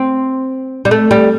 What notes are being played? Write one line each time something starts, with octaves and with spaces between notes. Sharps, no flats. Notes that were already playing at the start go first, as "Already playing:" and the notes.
Already playing: C4
G3
A3
G3